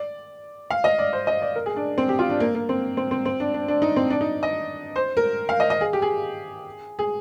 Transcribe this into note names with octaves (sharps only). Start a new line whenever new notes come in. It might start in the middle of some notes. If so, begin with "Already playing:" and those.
Already playing: D5
F5
D#5
D5
C5
D#5
D5
A#4
G#4
D4
C4
G4
F4
D4
A#3
A#3
C4
C4
C4
C4
D4
D4
D4
D#4
C4
D4
D#4
D#5
C5
A#4
F5
D#5
D#5
G#4
G4
G#4
G#4